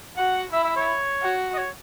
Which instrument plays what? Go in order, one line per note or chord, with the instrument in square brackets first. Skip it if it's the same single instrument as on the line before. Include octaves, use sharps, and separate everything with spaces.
[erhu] F#4 [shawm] F#5
[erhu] E4 [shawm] E5
[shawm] E5
C#5
[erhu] F#4
[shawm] D#5
C#5